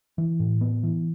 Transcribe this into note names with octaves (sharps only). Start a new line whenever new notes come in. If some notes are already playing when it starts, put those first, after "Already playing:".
E3
A2
B3
E3